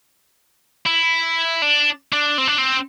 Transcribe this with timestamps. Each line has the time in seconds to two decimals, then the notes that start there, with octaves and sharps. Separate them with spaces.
0.86 E4
1.62 D4
2.13 D4
2.38 C4
2.47 D4
2.58 C4